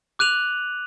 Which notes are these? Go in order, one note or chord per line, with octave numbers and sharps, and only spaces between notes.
D6 F#6 D#7 F7 F#7